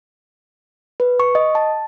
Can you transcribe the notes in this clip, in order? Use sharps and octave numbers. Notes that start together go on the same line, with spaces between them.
B4
C#6
D#5
A5